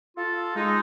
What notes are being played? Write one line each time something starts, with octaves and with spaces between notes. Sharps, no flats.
F4 A4
G#3 D#4